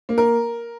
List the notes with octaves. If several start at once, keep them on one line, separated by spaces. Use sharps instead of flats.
A#3
A#4